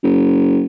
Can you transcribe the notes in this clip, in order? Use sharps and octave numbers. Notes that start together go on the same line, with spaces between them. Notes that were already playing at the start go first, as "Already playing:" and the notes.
F#1